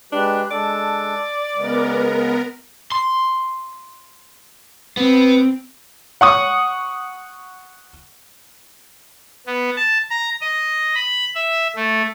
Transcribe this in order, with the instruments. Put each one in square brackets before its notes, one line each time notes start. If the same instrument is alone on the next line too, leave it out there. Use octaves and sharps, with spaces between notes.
[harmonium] G#3 G4 B4 [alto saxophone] D4
[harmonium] G#3 D4 A4 [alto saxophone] D5
[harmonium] C#3 G#3 [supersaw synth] B3 A#4
[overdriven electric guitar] C6
[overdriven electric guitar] B3 [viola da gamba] C4
[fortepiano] F#5 C#6 D#6
[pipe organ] B3
A5
A#5
D#5
B5
E5
A3